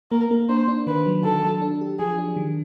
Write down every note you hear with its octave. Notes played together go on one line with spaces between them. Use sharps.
A#3 A#4
A#3
D4 C5
D4
D#3 B4
F#3
D#3 A4
F#3
D4
G4
F3 G#4
D4
D#3